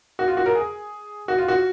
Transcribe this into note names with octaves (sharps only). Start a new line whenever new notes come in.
F#4
F4
F#4
A#4
G#4
F#4
F4
F#4